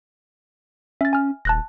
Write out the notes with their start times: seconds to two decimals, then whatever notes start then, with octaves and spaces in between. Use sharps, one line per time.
1.01 C#4 E5 A6
1.13 G#5 F6
1.45 D#1 A5 F#6 A#6